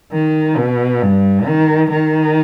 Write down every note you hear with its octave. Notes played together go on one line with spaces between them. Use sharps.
D#3
B2
G2
D#3
D#3